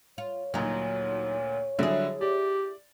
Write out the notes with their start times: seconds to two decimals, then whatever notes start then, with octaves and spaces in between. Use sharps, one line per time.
0.18 F4 C#5
0.54 D2 A#2 F#3 D#4
1.79 D3 F#3 G3 E4 G#4
2.21 G4 D5